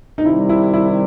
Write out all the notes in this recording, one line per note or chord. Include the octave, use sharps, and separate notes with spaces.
D#4
C3 D#3 G3 E4
E4
E4